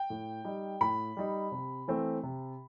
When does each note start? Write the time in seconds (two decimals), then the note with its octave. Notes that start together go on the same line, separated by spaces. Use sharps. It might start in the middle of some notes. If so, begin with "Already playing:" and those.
Already playing: G5
0.10 A2
0.44 G3 D#4
0.81 A2 B5
1.17 G3 D#4
1.52 C3
1.88 E3 A3 C4
2.23 C3